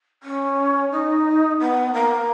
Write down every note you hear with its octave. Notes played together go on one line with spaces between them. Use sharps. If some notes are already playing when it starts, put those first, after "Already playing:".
C#4
D#4
B3
A#3